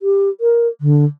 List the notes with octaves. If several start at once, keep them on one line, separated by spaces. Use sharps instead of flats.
G4
A#4
D3